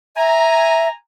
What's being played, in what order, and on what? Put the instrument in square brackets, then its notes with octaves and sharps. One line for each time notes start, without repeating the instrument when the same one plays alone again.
[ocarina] E5 [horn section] G#5 A#5